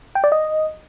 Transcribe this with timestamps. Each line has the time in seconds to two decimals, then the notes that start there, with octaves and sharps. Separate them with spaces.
0.15 G5
0.24 D5
0.32 D#5